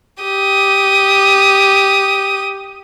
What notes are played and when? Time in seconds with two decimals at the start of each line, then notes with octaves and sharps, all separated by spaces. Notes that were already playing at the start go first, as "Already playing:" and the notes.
0.23 G4 D#6